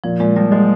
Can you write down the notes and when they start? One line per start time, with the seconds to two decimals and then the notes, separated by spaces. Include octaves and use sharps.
0.04 A#2 F3
0.20 A#2 G#3
0.36 F3 G3
0.51 F#3 G#3